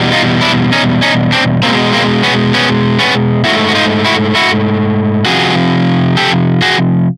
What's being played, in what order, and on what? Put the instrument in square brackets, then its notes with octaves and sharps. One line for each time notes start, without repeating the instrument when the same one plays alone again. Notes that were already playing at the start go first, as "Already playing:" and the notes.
Already playing: [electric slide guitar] E2 B2 G3
D#4 F4
D4 E4
C#4 D#4
C#4 D#4
C4 D4
B2 G#3 A#3 C4
A#3 C4
B3 C#4
B3 C#4
B3 C#4
G#2 F3 A3 E4 F#4
F#4
D#4 F4
E4 F#4
E4 F#4
C3 F3 F#4 G#4
G4 A4
F#4 G#4